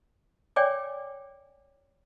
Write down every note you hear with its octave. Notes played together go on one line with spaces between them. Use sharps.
C#5 D5 G5 G#5 D6